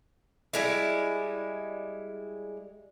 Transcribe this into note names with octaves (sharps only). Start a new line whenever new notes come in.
G3 G#3 E4